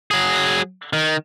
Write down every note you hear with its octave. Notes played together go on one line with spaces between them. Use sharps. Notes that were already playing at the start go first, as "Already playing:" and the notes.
F#3 G#4
D#3